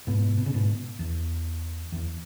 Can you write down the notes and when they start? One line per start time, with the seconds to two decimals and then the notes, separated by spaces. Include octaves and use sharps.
0.07 G#2 B2
0.38 B2
0.46 C#3
0.54 G#2 B2
0.99 E2
1.92 E2